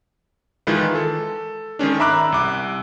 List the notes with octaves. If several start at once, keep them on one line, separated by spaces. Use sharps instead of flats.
D#3 E3 G#3 E4 F4 B4
A4
D#3 G#3 C#4 D4
E5 A#5 B5 D6 E6 F#6
C2 D6